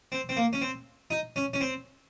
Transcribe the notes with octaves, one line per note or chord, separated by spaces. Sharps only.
C4
C4
A#3
C#4
C4
D#4
C#4
C#4
C4